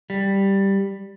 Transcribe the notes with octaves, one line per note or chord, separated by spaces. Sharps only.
G3